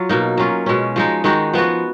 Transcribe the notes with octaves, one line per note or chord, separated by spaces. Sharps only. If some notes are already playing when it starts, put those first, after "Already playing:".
Already playing: F#3 F4
B2 A#3 D#4
F#3 C#4 F4
B2 G#3 C#4
F3 G#3 D#4
D#3 G#3 D#4 F#4
F3 B3 F#4